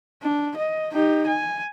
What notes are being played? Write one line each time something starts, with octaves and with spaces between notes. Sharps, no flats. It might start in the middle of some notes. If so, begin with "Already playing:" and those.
D4
D#5
D#4 G4
G#5